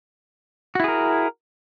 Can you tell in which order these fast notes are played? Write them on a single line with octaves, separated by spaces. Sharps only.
F#4 E4 G#4 A#4